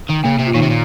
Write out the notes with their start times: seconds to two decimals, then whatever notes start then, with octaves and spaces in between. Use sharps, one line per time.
0.09 D#3
0.24 C#3 A#3
0.39 C3
0.46 F4
0.54 A#2 D#3 D#4
0.62 C3
0.70 A#2